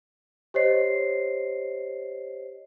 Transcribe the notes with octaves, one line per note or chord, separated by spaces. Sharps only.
G4 C5 C#5 D#5 C7